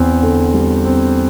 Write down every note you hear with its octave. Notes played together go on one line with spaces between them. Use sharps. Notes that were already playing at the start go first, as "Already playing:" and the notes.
Already playing: E2 C4
D3
G3
C4